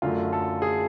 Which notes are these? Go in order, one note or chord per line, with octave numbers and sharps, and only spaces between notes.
F#2 D3 F#3 A3 F4
A4
G#4